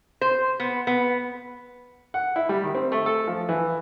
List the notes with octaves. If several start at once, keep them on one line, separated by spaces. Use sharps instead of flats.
C5
B3
B3
F#5
E4
G3
D#3
C4
A3
A4
F3
E3